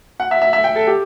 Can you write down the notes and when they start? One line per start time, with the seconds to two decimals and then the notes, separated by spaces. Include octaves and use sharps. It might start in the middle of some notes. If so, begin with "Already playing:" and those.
0.20 F#5
0.31 E5
0.42 E5
0.53 E5
0.64 G5
0.76 A4
0.87 G4